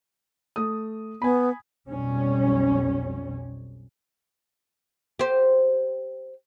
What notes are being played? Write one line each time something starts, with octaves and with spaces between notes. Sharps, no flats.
A3 D#6
B3 G#5 B5
B1 F2 G3 C#4
G4 C5